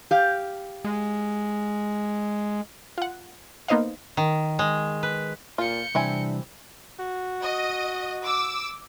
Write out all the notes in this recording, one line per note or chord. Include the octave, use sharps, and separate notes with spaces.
G4 F5
G#3
F4 F#5
A#3 B3 D#4 C5 D#5 F5
D#3
G#3
B4
A#2 F4 G6 C#7
C3 E3 G3 C4 D4 E4 G#5
F#4
D#5
D6 E6